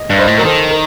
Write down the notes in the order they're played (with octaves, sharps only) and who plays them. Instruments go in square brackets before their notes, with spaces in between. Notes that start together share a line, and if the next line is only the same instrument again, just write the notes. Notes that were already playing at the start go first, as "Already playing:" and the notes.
Already playing: [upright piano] D#5
[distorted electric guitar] G2
[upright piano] C5 D#5
[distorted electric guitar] A2
[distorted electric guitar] F#3 [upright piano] A#4
[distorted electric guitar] D#3 [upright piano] A4 C5
[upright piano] A#4